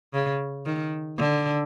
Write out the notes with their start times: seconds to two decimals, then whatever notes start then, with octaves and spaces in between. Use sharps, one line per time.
0.14 C#3
0.66 D#3
1.18 D3